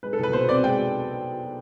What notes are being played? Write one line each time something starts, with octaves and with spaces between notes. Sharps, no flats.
G#3 B4
A4
C2 B4
B2 C5
C4 D5
G#3 G5